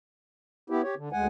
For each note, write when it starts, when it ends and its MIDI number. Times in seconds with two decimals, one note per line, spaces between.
0.70 0.82 59
0.70 0.82 64
0.70 0.82 67
0.83 0.95 67
0.83 0.95 73
0.97 1.09 50
1.12 1.27 38
1.12 1.27 56
1.12 1.27 78
1.12 1.27 80